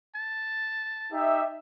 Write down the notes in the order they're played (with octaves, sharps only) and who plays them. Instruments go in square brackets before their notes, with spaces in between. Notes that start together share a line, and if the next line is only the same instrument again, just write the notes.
[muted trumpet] A5
[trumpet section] D#4 G4 E5